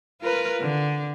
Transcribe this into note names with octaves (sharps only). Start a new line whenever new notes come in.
F4 A#4 B4
D3